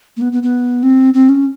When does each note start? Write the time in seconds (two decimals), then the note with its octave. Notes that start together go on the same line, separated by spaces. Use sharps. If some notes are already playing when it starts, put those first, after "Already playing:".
0.17 A#3
0.21 B3
0.32 B3
0.43 B3
0.83 C4
1.14 C4
1.29 C#4